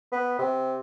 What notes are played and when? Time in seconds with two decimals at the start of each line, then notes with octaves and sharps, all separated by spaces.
0.12 B3
0.39 C3